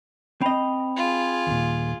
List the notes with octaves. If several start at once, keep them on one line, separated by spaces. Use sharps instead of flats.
C4 D#5 G5 B5 F7
F4 G#4
D#2 A#2